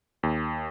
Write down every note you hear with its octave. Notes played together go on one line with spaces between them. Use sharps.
D#2